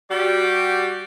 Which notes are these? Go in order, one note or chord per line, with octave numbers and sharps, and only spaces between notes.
G3 F#4 G4 D5